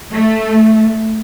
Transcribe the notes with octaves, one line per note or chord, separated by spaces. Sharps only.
A3